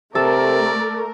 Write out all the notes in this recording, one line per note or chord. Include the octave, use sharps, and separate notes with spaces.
C3 A3 A4 A#4 D5